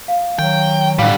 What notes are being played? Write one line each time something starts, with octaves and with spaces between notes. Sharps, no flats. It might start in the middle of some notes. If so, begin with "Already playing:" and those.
F5
D#3 F#3 G5
A2 D3 G3 F5 F#5